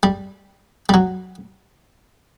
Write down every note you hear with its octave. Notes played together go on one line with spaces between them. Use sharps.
G3
G3
F#3